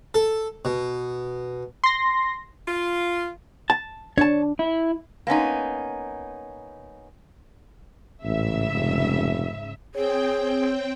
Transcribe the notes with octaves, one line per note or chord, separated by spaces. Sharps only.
A4
B2
C6 A#6
F4
A5
D4 C#5 A5
E4
A#3 B3 C#4 D#4
A1 G#2 C#3 E5
F1
C4 G#4 C#5 G5